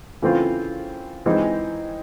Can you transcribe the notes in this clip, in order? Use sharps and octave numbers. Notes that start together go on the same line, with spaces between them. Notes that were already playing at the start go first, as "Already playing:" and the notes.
C#3 E3 A3 C4 F4
E3 G#3 C4 D#4